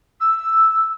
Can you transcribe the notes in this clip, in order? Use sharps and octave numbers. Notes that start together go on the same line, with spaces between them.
E6